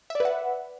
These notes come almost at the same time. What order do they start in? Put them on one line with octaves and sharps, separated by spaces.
E5 D5 B4 F#5